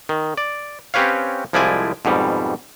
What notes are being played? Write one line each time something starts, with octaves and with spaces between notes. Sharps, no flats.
D#3
D5
C4 C#4 G4 B4 C#5 F5
C2 F3 G#3 E4 D5 G#5
F2 G#2 B2 G3